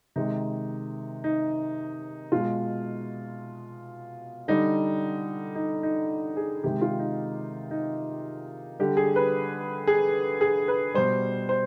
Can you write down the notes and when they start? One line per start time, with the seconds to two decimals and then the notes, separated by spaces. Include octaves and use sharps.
0.16 C3 D#3 G#3 D#4
1.24 D#4
2.32 B2 G#3 F4
4.48 D3 G3 D#4
5.55 D#4
5.83 D#4
6.37 G#4
6.64 C3 D#3 G#3 G4
6.81 F4
6.99 D#4
7.71 D#4
8.79 D3 G3 G4
8.97 G#4
9.16 B4
9.87 G#4
10.41 G#4
10.68 B4
10.94 B2 G3 C5
11.49 C5